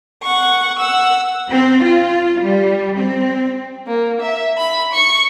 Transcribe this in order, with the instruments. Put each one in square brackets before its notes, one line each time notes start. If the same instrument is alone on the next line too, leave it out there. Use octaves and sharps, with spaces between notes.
[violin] F#5 C#6
F#5 E6
[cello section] C4
F4
G3
C4
[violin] A#3
E5
B5
C#6 C#7